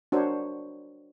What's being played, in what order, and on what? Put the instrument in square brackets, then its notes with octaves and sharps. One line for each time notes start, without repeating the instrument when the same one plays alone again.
[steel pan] D4 F#4 A#4 C5 C#5